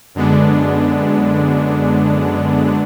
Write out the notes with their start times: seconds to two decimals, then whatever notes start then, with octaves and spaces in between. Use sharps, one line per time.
0.15 F#2 D3 G#3 B3 D4